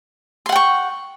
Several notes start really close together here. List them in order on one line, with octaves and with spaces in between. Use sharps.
C6 F#5 G5 C#6